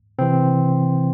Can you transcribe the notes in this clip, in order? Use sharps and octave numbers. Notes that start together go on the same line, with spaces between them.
C3 E3 C4